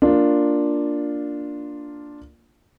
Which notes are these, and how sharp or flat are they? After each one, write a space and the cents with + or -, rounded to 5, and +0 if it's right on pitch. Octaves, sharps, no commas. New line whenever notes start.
A#3 +0 D4 +0 F4 +0